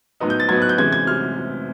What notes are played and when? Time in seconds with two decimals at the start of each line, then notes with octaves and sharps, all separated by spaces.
0.20 A2 F#3 B3 D#4
0.30 G6
0.40 A6
0.49 A2 F#3 B3 D#4 G#6
0.62 F#6
0.69 G6
0.77 C3 E3 G#3 C#4 G#6
0.93 G#6
1.07 C3 F6